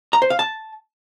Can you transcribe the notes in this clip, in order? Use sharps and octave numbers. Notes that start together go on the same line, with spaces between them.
A#5
C5
F5
A5